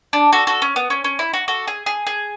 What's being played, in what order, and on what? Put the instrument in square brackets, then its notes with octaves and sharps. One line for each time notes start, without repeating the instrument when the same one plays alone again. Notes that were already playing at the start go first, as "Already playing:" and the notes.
[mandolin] D4
F#4 A4
F#4 A4
C#4
B3
C#4
C#4
E4
F#4
F#4 A4
G#4
G#4
G#4